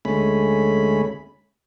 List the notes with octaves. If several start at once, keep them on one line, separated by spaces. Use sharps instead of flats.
D2 G#3 A3 C#4 B5